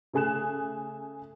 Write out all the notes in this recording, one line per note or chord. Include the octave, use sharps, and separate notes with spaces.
C#3 A3 G#4 G#5 F#6 E7